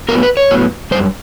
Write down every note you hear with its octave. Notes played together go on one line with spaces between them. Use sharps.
A2 F#3 B3 A#4
B4
C#5
A2 F#3 B3
F#2 D#3 G3 C5